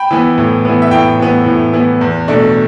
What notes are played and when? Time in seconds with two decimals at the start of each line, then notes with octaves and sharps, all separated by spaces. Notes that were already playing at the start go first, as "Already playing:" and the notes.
Already playing: G5 B5
0.11 E3 B3
0.38 A2
0.65 E3 B3
0.82 E5
0.91 A2 G5
1.19 E3 B3
1.46 A2
1.73 E3 B3
2.01 E2
2.28 B2 A3 D4